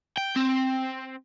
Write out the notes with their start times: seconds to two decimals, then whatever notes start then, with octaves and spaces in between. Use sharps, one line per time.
0.17 G5
0.36 C4